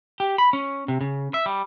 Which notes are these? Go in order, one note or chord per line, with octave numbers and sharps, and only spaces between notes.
G4
B5
C#4
C3
C#3
E5
G3